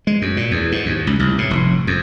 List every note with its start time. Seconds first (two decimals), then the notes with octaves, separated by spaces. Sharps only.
0.07 G#3
0.22 F#2
0.37 A#2
0.51 E2
0.72 G#2
0.86 D#2
1.07 C#2
1.19 C2
1.38 A2
1.51 F1
1.87 F2